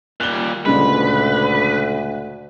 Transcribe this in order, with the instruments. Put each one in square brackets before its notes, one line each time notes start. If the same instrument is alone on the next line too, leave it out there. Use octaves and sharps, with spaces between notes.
[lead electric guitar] A#2 G3 [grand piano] F#6 G7
[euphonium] D2 [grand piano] A#2 C#3 G#3 [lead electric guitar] B4